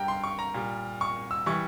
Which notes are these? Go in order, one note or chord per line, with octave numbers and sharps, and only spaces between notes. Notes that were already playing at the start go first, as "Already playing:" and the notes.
Already playing: G2 G3 G5 A#5
C6
C#6
A#5
A#2 G3
C#6
E6
E3 G3 C#6